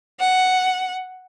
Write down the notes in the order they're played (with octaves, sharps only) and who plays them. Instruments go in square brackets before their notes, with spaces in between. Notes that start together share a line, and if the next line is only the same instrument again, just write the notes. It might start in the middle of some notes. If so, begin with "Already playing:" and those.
[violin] F#5